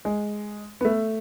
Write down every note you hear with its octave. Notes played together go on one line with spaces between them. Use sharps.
G#3
B3
A3